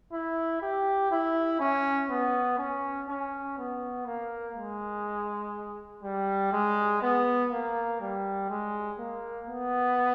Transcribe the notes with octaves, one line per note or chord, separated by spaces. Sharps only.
E4
G4
E4
C#4
B3
C#4
C#4
B3
A#3
G#3
G3
G#3
B3
A#3
G3
G#3
A#3
B3